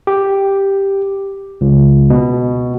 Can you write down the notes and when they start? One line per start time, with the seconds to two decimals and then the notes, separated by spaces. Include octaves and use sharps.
0.07 G4
1.61 C#2
2.10 B2